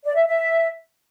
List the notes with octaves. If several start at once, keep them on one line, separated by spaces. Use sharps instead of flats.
D5
E5
E5